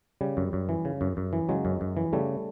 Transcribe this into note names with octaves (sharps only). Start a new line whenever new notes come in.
C#3 G3
F#2
F#2
E3
C#3
F#2
F#2
E3
C#3 F#3 G#3
F#2
F#2
E3
C#3 G3 A3